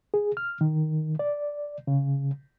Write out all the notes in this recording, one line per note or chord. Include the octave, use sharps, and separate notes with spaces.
G#4
F6
D#3
D5
C#3